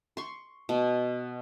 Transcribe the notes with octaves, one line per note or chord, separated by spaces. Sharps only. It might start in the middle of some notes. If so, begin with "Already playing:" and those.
C6 C#6
B2